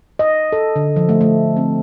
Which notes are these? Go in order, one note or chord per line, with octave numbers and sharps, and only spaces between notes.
D#5
A4
D3
F3
A3
A3
C4